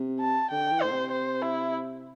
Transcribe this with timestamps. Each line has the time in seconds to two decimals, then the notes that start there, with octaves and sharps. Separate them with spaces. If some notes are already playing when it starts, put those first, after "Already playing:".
Already playing: C3
0.20 A5
0.51 D3 G5
0.71 E3
0.82 A2 C5
0.91 C3
1.12 C5
1.42 E4